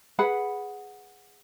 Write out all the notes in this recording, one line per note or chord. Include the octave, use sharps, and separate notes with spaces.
G#4 B4 F#5 B5